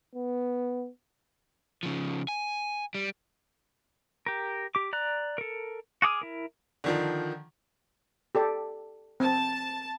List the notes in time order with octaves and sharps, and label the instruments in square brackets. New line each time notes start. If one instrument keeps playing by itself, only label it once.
[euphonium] B3
[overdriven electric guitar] C#3 F3
G#5
G3
[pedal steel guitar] G4 A#4
G4 D6
D5 A#5 F#6
A4 A#4
F#4 G#4 D6 D#6 F6
E4 A#4
[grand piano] D3 D#3 F3
[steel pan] G4 A4 D5
[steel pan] C4 [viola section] A5